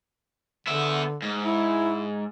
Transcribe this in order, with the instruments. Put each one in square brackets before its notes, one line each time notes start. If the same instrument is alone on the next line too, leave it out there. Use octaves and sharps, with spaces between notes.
[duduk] D3 [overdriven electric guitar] B3 E5
[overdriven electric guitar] G#2
[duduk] E4